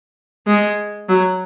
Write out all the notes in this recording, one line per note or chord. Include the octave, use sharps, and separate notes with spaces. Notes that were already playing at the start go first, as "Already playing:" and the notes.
G#3
F#3